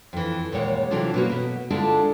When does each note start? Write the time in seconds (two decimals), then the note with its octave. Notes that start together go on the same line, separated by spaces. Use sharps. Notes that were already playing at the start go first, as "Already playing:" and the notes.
0.13 F2 E3
0.52 D#2 A#2 C#3 G#3 C#5 F#5
0.91 C3 E3 F#3 D4 F4 A4
1.14 B2 F#3 A#3 C#4 F#4
1.29 B2 B3
1.70 D3 G#3 D4 E4 F4 A4